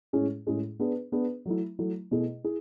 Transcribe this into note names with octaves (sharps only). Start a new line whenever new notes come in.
A2 G#3 C#4 E4 G#4
A2 G#3 C#4 E4 G#4
B3 D4 G#4 B4
B3 D4 G#4 B4
F#3 A3 E4
F#3 A3 E4
B2 A3 E4 G#4
E4 G#4